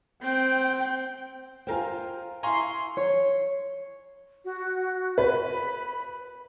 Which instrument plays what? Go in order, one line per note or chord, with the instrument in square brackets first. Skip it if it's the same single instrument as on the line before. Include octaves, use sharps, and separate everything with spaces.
[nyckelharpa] C4 [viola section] G5
[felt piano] F4 A#4 G5 [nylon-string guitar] C5 F5 G#5
[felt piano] E4 F5 [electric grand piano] G#5 A#5 C#6 [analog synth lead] C6
[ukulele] C#5
[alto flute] F#4
[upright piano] B4 [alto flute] B5